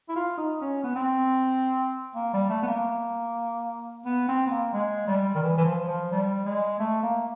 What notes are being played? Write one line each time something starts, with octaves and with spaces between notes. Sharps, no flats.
E4
F4
D#4
C#4
B3
C4
A#3
G3
A3
B3
A#3
B3
C4
B3
A#3
G#3
G3
D#3
E3
E3
F3
F3
G3
G#3
A3
A#3